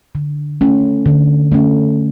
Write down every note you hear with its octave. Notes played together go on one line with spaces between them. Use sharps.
D3
A3 C#4
D3
A3 C#4